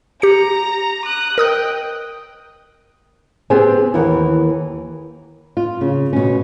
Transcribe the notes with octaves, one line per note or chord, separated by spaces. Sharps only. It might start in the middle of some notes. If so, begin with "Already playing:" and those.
G4 A#5 C#7
D#6 F#6
A#4 D#5 G5 D#6 F#6
B3 C4 G4 G#4 C5 G#5
D#2 E3 A#3 A#4 F#5
F4
C#3
B2 C#4